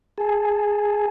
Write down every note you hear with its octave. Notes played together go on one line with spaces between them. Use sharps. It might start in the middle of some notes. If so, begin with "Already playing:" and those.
G#4 G#5 A5